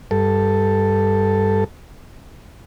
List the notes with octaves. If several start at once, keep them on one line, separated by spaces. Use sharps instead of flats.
G2 A4